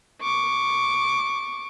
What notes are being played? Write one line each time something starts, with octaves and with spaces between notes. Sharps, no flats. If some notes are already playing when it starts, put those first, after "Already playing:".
C#6 D6